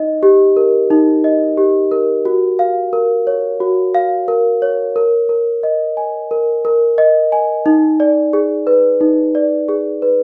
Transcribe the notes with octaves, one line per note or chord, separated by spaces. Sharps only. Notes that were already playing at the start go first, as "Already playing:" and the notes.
Already playing: D#4 D#5
G4
A#4
D#4
D#5
G4
A#4
F#4
F5
A#4
C#5
F#4
F5
A#4
C#5
A#4
A#4
D#5
G#5
A#4
A#4
D#5
G#5
D#4
D5
G#4
B4
D#4
D5
G#4
B4